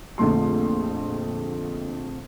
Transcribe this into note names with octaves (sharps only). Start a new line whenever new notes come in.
A#1 F2 D3 A3 C6